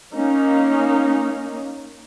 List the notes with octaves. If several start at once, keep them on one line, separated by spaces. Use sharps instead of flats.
A#3 C#4 D#4